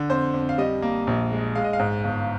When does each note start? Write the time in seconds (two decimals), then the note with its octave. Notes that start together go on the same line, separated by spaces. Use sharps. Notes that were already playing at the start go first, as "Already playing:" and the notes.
Already playing: D3
0.10 F2 C5
0.34 F2
0.49 F5
0.58 G3 D#5
0.82 A#3
1.07 A#1
1.32 G#3
1.55 G#3 F5
1.64 D#5
1.73 F5
1.79 G#2
2.04 G1